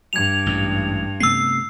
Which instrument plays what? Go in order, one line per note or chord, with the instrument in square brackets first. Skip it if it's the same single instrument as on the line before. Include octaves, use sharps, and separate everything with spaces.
[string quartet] G2 [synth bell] G#6 F7
[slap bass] A1 G#2
[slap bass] C3 A3 B3 [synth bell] E6 C7